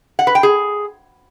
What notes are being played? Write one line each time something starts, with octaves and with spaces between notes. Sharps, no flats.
F#5
B4
G5
G#4